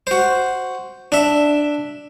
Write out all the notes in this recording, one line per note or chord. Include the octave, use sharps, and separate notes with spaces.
F#4 C5
D4 E5